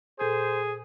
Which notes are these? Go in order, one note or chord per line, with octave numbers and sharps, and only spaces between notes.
A#2 G#4 A4 C5 G6